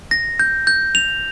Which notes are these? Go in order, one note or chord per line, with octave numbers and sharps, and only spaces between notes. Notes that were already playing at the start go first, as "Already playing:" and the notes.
A#6
G6
G6
F7